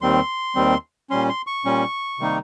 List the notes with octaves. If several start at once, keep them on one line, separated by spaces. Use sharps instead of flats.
D#2 D#3 G3 C4 C6
D#2 D#3 G3 C4
A#2 G3 C#4 C6
C6
C#6
A#2 G3 C#4
C3 D#3 G3 A#3 D#4